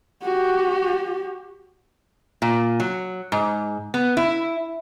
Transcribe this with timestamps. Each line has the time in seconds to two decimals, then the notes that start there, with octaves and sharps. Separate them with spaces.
0.22 F#4 G4
2.42 A#2
2.80 F#3
3.32 G#2
3.94 B3
4.17 E4